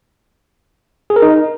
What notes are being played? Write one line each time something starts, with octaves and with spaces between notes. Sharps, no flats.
G#4
A#4
D#4